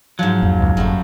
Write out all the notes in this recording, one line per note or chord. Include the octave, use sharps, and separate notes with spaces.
G#2 F3 F#3
F2 A#3
C#2
F#1 F#2 G3 A3